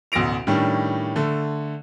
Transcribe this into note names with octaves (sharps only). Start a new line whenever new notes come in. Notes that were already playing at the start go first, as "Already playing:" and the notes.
A1 D2 B2 A#6 D7 F7
A2 D#3 G3 C#4 D4
D3 A3